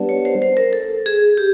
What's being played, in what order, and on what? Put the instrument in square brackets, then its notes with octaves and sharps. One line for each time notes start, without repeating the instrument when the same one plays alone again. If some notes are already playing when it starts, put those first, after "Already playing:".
Already playing: [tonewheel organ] G3 B3 D4
[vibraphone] C#5
C5
C5
A#4
A4
G#4
G4